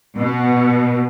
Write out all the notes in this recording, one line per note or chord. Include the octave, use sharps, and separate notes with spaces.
B2